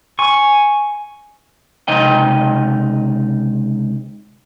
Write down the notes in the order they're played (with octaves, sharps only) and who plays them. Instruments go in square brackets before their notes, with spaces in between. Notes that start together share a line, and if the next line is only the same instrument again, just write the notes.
[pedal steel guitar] G#5 C#6
[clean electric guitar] C#2 C3 D#4 D#5 G5